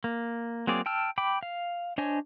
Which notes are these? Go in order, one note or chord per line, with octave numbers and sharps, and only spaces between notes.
A#3
F#3 A#3 C4 G#4 D5
G5 A5 E6 F6
G5 B5 D6
F5
D4 C5 C#5 D#5 G#5